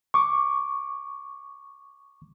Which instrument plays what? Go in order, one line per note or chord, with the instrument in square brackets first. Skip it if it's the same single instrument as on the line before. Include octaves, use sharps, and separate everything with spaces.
[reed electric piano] C#6 D6